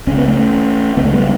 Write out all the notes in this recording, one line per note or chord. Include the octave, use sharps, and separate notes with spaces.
C#2 C#3 C#4
B3
A3 C#4
C#2 C#3 A3 B3
G3 B3